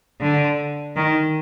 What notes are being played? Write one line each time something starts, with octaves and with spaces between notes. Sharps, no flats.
D3
D#3